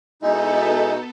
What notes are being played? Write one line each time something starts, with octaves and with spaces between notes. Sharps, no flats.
B2 G#3 B3 D#4 E4 A4